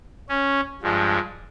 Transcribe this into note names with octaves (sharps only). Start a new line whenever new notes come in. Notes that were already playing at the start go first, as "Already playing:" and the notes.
C#4
G2 F3 G#3